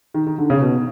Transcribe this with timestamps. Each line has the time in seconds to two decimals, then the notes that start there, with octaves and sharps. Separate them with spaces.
0.14 D#3
0.27 D#3
0.38 D3
0.50 C#3
0.62 B2